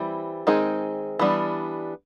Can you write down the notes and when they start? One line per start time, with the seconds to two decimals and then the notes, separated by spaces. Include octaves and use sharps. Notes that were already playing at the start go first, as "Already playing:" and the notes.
Already playing: E3 G3 C4 E4
0.47 D#3 G#3 C4 D#4 G#4
1.19 E3 G3 B3 D4